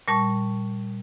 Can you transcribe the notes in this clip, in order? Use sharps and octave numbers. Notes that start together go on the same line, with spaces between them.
A#2 G3 A5 C#6